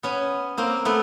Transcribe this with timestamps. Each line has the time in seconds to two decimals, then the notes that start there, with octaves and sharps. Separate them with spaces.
0.03 B3 C#4
0.58 A#3 C4
0.85 A3 B3